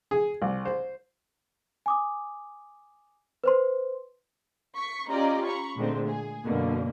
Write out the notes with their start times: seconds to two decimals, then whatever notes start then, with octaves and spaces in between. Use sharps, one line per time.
0.11 G#4
0.42 C2
0.65 C5
1.86 G#5 D6 D#6
3.44 B4 C5 C6
4.77 C#6 B6
5.09 C#4 F4 G4 D5 D#5 A#5
5.45 A#5 B5 C#6
5.76 A#2 D3 G#3 A3 C4
6.09 G#4
6.45 F#2 B2 D3 A#3